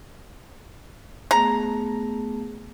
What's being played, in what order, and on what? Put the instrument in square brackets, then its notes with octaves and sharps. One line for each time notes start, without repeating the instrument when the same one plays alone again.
[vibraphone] A3 B3 G#4 [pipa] A#5